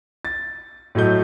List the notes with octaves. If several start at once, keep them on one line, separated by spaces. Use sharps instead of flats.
A6
A2 F#3 A3 D#5 G6